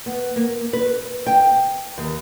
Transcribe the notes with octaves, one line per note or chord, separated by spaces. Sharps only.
B3
A#3
B4
G5
D#2